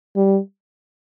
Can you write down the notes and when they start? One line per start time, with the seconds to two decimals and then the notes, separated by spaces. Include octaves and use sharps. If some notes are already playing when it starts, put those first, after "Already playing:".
0.16 G3